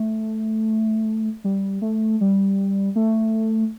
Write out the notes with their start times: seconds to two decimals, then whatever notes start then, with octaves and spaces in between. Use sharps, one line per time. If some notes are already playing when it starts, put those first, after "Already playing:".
Already playing: A3
1.44 G3
1.82 A3
2.21 G3
2.96 A3